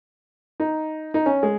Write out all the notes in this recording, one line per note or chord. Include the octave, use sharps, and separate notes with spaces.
D#4
D#4
C#4
G#3